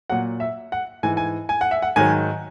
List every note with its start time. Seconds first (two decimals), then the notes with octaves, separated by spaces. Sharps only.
0.10 A#2 F#3 F#5
0.40 E5
0.72 F#5
1.03 G#2 E3 G#5
1.17 G#5
1.49 G#5
1.61 F#5
1.71 E5
1.82 F#5
1.96 G#2 D#3 F#3 G#5